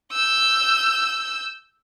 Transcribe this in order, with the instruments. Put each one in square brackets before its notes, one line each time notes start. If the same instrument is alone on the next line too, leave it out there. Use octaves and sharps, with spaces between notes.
[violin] E6 G6